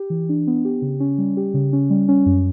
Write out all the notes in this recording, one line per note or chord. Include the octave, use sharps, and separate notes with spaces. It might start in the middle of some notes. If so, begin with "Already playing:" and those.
Already playing: G4
E3
D4
B3
G4
C#3
C#4
G3
G4
C#3
C#4
G3
C#4
F#2